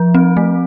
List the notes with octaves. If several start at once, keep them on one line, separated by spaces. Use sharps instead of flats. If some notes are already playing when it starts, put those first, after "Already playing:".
Already playing: F3
C4
A3